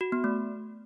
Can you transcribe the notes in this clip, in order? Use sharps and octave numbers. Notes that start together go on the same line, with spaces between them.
F#4
B3
A3